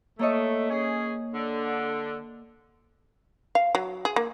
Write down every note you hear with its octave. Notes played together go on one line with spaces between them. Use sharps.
A3 A#3 C#5 D#5
C#4 G#4
D3
F5
F#3
G#4
A#3